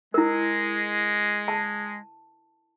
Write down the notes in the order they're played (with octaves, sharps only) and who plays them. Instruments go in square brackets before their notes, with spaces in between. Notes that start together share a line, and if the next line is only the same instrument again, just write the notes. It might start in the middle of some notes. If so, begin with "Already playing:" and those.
[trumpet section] G#3 [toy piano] E4 A#4
[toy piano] A5